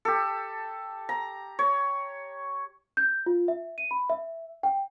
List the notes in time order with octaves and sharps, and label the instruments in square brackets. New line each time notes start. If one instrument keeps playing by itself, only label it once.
[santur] G4 A4
A#5
C#5
[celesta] G6
F4
E5
D#7
B5
E5
G5